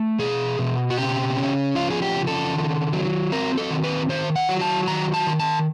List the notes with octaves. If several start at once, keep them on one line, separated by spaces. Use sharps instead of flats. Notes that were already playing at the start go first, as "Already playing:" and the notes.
Already playing: A3
B2 G#4
B2
F#4
C#3 G4
C#4
F3 F4
G#4
G4
C#3
A4
D#3
F#3
C4 A#4
A4
D#3
B4
D#3 C5
F#5
F#3
A5
D#3 A#5
A5
D#3
A5